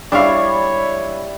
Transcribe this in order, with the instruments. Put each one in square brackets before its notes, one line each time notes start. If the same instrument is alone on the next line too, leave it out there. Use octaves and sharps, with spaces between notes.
[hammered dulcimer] G3 E4 C#6 [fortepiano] D4 F5 [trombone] C#5